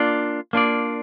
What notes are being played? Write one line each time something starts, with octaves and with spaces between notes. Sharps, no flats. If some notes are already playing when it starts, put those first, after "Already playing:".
Already playing: A#3 D4 F4 D5
A#3 D4 F4 D5